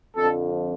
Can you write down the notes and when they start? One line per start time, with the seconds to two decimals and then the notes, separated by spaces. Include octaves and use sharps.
0.17 F2 D3 A4